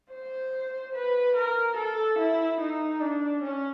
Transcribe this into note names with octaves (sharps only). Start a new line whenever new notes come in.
C5
B4
A#4
A4
E4
D#4
D4
C#4